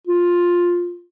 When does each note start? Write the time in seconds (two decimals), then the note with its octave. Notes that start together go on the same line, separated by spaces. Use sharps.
0.07 F4